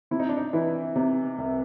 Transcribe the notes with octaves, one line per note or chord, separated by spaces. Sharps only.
C3 E4
D#4
D4
D#4
E3 E4
C3 D#4
C2